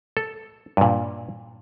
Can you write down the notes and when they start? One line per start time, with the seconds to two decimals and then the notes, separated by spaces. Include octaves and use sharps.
0.17 A4
0.77 G2 A#2